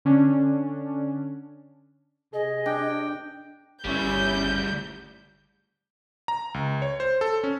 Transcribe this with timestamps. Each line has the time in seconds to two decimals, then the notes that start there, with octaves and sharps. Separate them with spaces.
0.05 D3 C#4 D4
2.34 C3 G#4 D#5
2.66 D4 G5
3.84 G1 D2 G3 C#4 E4 G6
6.28 A#5
6.54 C#2
6.82 C#5
7.00 C5
7.21 A4
7.44 C#4